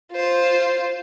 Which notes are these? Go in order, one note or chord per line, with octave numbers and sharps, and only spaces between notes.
F4 C5